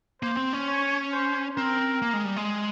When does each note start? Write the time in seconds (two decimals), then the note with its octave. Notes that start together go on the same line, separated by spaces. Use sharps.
0.22 A#3 C5
0.37 C4
0.53 C#4
0.67 C#5
1.12 C5
1.57 C4 A#4
2.02 A#3
2.13 G#3
2.25 G3
2.36 G#3